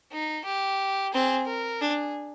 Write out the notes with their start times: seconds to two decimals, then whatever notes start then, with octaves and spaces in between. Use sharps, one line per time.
0.12 D#4
0.46 G4
1.13 C4 G#4
1.47 A#4
1.81 D4 G#4